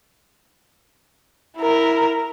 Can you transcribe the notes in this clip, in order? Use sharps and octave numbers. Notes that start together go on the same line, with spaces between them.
E4 A#4